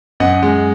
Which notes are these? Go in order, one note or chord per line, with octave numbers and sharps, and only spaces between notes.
F#2 D#5 F#5
G#3